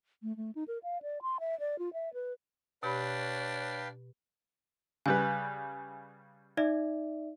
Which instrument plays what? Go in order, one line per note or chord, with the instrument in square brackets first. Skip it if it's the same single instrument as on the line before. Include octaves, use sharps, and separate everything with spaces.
[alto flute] A3
A3
D#4
A#4
F5
D5
C6
E5
D5
F4
E5
B4
[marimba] B2 G4 B5 [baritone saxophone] D4 [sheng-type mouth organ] B4 F5 G5 [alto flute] C#5
[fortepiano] C#3 G3 B4 [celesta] G#5
[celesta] D#4 D5 E5